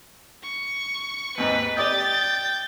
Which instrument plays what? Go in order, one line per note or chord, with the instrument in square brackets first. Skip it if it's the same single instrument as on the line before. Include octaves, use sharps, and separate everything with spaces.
[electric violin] C#6
[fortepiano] D#2 G#2 [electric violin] B4
[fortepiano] G4 D5 D#5 [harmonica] G5 [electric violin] A6